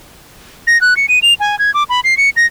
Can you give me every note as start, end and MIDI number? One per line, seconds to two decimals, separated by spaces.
0.67 0.80 94
0.81 0.96 90
0.97 1.06 97
1.09 1.19 99
1.22 1.34 101
1.40 1.58 80
1.59 1.73 92
1.74 1.84 86
1.89 2.00 83
2.04 2.17 96
2.17 2.30 97
2.36 2.46 94